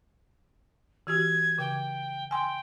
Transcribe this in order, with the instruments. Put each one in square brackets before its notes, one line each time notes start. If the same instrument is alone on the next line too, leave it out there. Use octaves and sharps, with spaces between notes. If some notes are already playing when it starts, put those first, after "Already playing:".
[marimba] E3 F#4 G4 [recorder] G#6
[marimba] C#3 [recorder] G5
[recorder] G5 [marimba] G#5 C6